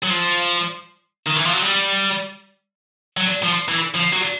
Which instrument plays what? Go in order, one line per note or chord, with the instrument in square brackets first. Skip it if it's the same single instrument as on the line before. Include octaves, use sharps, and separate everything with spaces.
[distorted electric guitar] F#3
F3
D#3
E3
F3
F#3
G3
F#3
F3
E3
F3
F#3